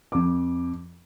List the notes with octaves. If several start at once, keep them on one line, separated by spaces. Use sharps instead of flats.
F2 D6